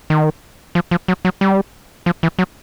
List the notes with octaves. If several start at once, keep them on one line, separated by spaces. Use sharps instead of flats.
D#3
F3
F3
F#3
F#3
G3
F3
E3
F#3